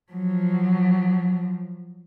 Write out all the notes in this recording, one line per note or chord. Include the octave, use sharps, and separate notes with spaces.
F3 F#3